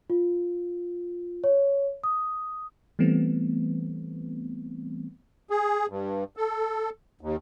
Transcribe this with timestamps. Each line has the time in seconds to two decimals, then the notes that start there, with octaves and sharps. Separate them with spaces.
0.10 F4
1.44 C#5
2.04 D#6
2.99 E3 G3 A3 B3 C4
5.50 G#4
5.90 G2
6.37 A4
7.21 D#2